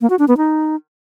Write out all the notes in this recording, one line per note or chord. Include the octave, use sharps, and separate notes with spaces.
A#3
F#4
D4
B3
D#4